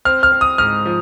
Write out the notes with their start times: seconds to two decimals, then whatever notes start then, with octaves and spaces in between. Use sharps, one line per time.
0.05 C4 F6
0.23 F6
0.32 C4
0.41 D#6
0.58 G#2 F6
0.86 F3